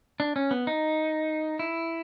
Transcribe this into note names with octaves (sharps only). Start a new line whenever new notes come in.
D4
C#4
B3
D#4
E4